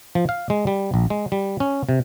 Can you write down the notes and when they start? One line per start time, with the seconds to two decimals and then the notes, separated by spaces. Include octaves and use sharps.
0.15 F3
0.29 F5
0.50 G#3
0.67 G3
0.94 A#1
1.10 G#3
1.32 G3
1.60 C#4
1.89 C3